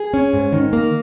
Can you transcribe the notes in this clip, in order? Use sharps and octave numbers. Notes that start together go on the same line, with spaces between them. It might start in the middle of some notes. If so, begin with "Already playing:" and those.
Already playing: G#4
C#4
G#2
D#3
A#3